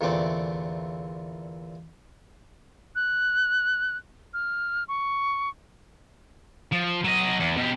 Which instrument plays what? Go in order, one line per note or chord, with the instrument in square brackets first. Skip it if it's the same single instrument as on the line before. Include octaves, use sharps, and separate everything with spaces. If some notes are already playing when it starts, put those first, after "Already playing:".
[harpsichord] E2 A#2 D3 A3 C4 D5
[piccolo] F#6
F6
C#6
[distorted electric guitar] F3
F#3 D#5
E2
B2 G4